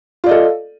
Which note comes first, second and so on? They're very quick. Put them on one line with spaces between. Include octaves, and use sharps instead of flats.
F4 D5 D#5 A4